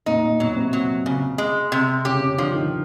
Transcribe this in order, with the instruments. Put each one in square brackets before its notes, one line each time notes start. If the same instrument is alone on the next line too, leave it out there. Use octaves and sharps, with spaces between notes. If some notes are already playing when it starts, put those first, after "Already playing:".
[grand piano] A#2 A#3 [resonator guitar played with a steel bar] D#4
[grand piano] A#2 A#3
[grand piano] B2 B3 [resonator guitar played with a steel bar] F#3
[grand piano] B3
C3 C4
[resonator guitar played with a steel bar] F#3
C#3
G#3
C3
[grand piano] C#3 C#4 [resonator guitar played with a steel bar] G4
[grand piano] C#3 C#4
[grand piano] D3 D4 [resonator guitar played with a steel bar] F3
[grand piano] D#3 D#4